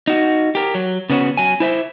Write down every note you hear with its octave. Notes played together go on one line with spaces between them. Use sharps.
D#4 F#4
G4 A#4
F#3
C#3 B3 C#4 F#4
F#3 G#5
E4 C5 E5